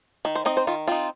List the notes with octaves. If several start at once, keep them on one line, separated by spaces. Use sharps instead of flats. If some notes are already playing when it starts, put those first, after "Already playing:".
D#3
C5
C4 D#4 D#5
C5
D#3 F4
C4 D#4 F4